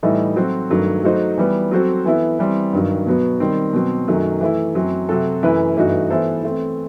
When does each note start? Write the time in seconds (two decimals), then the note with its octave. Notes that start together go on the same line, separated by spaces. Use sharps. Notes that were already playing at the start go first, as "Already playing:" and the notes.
0.03 A2 E3 G3 D#4 A4
0.36 F#3 C4 F#4 A4 C5
0.70 G2 D#3 F#3 A3
1.04 F#3 A3 D#4 F#4 C5
1.37 E3 G3 B3
1.71 F#3 C4 F#4 A4 C5
2.05 E3 B3 E4 A4
2.39 E3 G3 C4
2.73 G2 D#3 F#3
3.06 B2 F#3 B3
3.40 D#3 G3 C4
3.73 B2 F#3 C4
4.08 F#2 D#3 F#3 A3
4.41 E3 A3 E4
4.75 F#2 F#3 C4
5.09 C3 F#3 C4 F#4 A4
5.43 F#2 E3 A3 E4 B4
5.77 G2 E3 A3 D#4 F#4
6.10 E3 B3 E4 A4 C5
6.43 E3 A3 C4